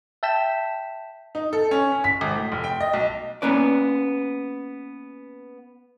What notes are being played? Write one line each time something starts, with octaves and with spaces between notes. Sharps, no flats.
E5 G5 A5 G6 B6 E7
D#4
A4
C#4
C#4
B6
G#1
A2
F1
G5
D#5
B1
A#3 B3 C#4 B4 D5